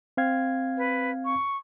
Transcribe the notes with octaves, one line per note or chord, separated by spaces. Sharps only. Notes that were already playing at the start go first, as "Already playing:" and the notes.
C4 F5 G#6
B4
C#6